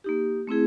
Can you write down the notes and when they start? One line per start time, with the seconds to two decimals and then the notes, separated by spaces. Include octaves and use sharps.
0.04 A#3 D#4 G4
0.47 A3 C4 E4 G#4